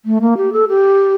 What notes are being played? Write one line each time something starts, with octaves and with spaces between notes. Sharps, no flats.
A3
A#3
G4
A4
G4